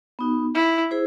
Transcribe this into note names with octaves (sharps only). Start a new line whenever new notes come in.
B3 D#4 F#4
E4
E4 G#4 C5